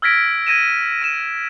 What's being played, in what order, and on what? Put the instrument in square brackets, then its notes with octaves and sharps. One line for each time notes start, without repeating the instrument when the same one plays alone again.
[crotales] E6 F6 G#6 A#6 B6 D7
G#6 A#6 D#7 E7
A#6 D#7 E7